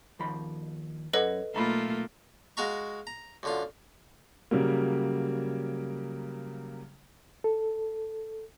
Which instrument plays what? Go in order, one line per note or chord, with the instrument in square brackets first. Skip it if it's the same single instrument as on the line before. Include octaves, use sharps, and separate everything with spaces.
[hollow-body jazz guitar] D#2 F3 B5
[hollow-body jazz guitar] F#2 C#5 F#5 [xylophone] A4 B4 D#5
[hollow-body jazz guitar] B1 A#5 B5 [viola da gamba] A3 A#3 F4
[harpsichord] G#3 F#4 F5 A#5 C#6
A#5
F#2 D3 F4
[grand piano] C#3 F#3 G3 A#3
[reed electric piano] A4